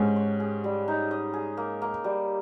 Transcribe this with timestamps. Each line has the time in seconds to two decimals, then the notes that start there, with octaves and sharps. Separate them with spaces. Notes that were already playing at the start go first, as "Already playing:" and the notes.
Already playing: G#2 C#4 G4
0.16 C#5
0.40 G#4
0.64 G3
0.88 D#4
1.11 D#5
1.34 G#4
1.57 A#3
1.82 A#3
2.04 G3